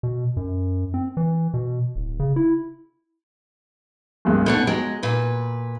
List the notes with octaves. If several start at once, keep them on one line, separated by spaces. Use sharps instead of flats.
B2
F#2
C4
E3
B2
D1
C#3
E4
G#1 C#2 G2
B2 A3 C#4 D4
F#3 G#3
A#2 B4